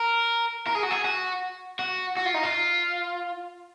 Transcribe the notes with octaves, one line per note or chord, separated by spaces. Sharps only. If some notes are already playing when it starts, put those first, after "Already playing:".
Already playing: A#4
A#4
G#4
F#4
G#4
F#4
F#4
F#4
F4
D#4
F4